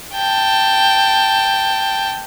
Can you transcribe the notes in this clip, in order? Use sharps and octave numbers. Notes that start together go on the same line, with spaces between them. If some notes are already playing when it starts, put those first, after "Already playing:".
G5 A5